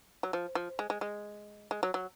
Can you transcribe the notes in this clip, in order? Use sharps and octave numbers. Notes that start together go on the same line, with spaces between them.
F#3
F3
F3
G#3
G#3
G#3
G#3
F#3
F#3